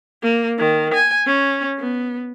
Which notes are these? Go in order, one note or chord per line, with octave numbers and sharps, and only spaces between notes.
A#3
D#3
G#5
C#4
B3